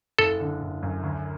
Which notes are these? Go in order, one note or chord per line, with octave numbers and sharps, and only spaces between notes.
F#1 A4
D3
F#1
F#2
D2